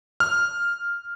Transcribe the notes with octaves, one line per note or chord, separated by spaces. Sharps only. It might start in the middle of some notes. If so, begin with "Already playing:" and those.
F6